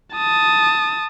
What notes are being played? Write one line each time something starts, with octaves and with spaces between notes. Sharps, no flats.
A5 D#6